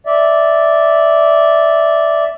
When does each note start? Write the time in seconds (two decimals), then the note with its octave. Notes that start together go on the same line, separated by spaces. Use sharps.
0.06 D5 E5